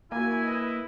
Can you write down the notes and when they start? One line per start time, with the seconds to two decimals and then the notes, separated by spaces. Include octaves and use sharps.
0.12 A#3 E4 F#4 G#5
0.45 B4 D#5